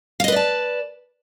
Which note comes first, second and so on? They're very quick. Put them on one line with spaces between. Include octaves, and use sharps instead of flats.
F5 D#5 B4 D5 A5